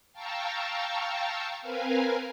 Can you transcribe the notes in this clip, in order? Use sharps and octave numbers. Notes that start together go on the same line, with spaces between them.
F5 G5 A5 A#5 C#6 E6
C4 A#4 B4 F5 G#5